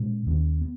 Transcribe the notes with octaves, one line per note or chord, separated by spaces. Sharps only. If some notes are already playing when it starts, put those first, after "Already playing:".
Already playing: A#2 G#3 C#4
D#2 D#3 A#3 C#4
B3